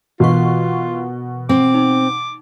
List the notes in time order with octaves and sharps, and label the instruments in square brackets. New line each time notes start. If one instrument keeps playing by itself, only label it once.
[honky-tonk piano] B2 [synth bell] E3 C#6 [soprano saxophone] F4
[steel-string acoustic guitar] C4 [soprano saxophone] D6
[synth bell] D#4